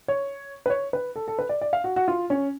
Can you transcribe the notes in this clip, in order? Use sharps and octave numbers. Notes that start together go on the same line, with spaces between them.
C#5
B4
C#5
B4
A4
A4
B4
D5
D5
F5
F#4
F#4
F4
C#4